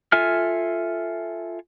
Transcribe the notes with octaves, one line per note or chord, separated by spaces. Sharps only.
F4 A4 E5 G#5 F6